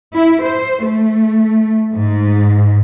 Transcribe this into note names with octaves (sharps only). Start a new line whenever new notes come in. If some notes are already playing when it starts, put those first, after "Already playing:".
E4
C5
A3
G#2